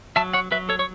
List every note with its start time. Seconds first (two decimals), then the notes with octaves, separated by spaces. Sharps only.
0.16 F#3 E5 A5
0.33 C#5 F#5
0.51 F#3 B4 E5
0.69 A4 C#5
0.79 C#5